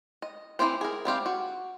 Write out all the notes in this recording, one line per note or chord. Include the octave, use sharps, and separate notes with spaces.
D#5
E3 F3 C4 G4 C5
G#4 A#4
G3 C4 G4 F5
F#4